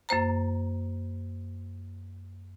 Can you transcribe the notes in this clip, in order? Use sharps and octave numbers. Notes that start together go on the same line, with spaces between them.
F#2 A#3 C5 A#5